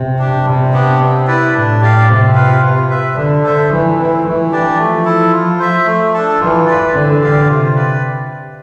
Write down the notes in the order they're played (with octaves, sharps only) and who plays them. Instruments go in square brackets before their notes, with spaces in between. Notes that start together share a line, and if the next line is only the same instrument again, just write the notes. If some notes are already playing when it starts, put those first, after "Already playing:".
Already playing: [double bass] C3
[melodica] D4 G4
[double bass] C3 [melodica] G3
[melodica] B3 D4 G4
C4
E4 B4 D5
[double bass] A2 [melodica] D4
[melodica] G4 D5 F5
[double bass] C3 [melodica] C4
[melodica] F4 B4 F5
F4
B4 E5
[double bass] D3 [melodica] D4
[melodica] A4 C5 E5
[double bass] E3 [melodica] A3
[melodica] C4 E4
[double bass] E3 [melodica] A3
[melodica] D4 G4 D5
[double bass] F3 [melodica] A3
[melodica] E4 A4
F4
C5 E5
A3
D4 A4
[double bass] E3 [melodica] F4
[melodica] B4 D5
[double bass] D3 [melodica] C4
[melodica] G4 D5 F5
[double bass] C3 [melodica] F4
[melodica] B4 D5